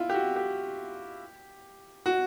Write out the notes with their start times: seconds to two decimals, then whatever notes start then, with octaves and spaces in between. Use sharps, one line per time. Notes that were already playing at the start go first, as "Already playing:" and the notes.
Already playing: E4 F4
0.10 G4
0.15 F#4
0.36 G4
2.06 F#4